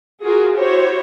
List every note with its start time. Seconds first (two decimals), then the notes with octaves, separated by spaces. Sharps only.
0.24 F4 F#4 G#4 A#4
0.56 E4 F#4 G4 C5 C#5